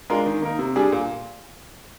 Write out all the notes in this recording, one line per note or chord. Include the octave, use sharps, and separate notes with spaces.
G#3 D4 F4 A#4
D#3
A#3 D#4 A#4
C3
G3 D4 G#4
A#2